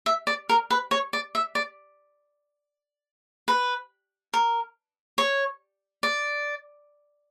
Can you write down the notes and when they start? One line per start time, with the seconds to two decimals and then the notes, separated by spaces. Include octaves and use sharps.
0.06 E5
0.27 D5
0.49 A#4
0.70 B4
0.91 C#5
1.13 D5
1.35 E5
1.55 D5
3.48 B4
4.34 A#4
5.18 C#5
6.03 D5